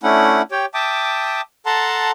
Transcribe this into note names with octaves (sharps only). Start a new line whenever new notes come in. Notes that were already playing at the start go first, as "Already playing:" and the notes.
A3 C#4 D4 E4 F#5
G4 C#5 G5
E5 G5 A5 D6 D#6
A4 F#5 A5 A#5 C6